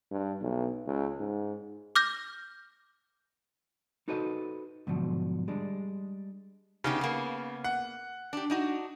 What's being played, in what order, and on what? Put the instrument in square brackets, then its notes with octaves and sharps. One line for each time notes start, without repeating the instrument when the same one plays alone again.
[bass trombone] G2
B1
C#2
G#2
[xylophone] D6 F6 G6 A#6
[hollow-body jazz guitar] D#4 F#4 A4 B4 C5 D#5
G#2 B2 D3 F3 F#3
G3 G#3 D4
[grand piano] C#3 [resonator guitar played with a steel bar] B3 D#4 G4
[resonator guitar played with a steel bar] A#3 B3
[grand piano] F#5
[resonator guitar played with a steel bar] D4 G4
D4 D#4 F#4